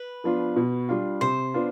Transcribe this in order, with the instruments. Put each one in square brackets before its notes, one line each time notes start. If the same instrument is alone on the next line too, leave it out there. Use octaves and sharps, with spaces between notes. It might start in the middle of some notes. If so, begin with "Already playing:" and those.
Already playing: [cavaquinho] B4
[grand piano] F3 B3 D4 F4
B2
G3 D4 F4
[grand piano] C3 [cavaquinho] C5
[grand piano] B3 D4 F4